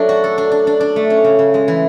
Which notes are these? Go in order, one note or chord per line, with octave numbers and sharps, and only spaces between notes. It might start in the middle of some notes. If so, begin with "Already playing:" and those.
Already playing: F#3 A3 D4
F#4
A4
D4
D4
D4
D4
A3
C#4
C#3
C#3
G#3
E3